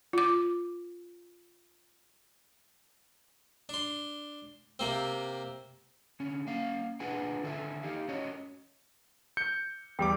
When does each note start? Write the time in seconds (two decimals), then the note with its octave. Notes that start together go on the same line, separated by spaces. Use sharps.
0.13 F4 D6
3.69 D4 C6
4.79 C3 A#3 C4
6.20 D3 C#4
6.47 A#3 C#4 F5
7.00 D4 F4 G#4 B4 F#5 G#5
7.43 D3 D#3 A4 B4 E5 G#5
7.83 D#4 G4 F5
8.08 C#4 F#4 C#5 D#5
9.37 G6 C#7
9.99 E2 G3 G5 D6